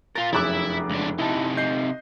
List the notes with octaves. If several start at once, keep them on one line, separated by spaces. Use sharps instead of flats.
F4 A#4 A6 F7
F1 F#2 E4 G#4 E5 D6 F#6
C#2 D4
C3 D#4 E4 A5
D#5 G6 C7